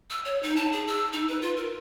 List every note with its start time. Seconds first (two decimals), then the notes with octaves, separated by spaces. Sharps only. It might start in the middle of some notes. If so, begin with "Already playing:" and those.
0.10 E6
0.25 C#5
0.43 D#4
0.56 A5
0.72 G#4
0.87 E6
1.13 D#4
1.28 B4
1.42 F4
1.57 A#4